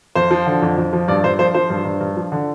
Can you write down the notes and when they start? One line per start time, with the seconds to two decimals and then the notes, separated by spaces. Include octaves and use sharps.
0.15 F2 C5
0.31 F3
0.46 D3
0.62 F2
0.78 F2
0.93 F3
1.08 G2 D5
1.24 G2 C5
1.39 F3 C5
1.54 F3 C5
1.70 G2
1.85 G2
2.01 G2
2.17 F3
2.32 D3